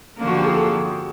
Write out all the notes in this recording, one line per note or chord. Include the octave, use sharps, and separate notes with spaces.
D3 F3 A#3
F#4
G4
G#4
A4